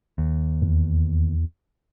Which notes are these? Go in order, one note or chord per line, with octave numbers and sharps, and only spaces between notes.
D#2
E2